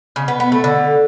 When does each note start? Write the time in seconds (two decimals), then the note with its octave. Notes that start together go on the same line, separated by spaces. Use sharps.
0.16 C#3
0.28 B3
0.40 B3
0.52 A3
0.64 D3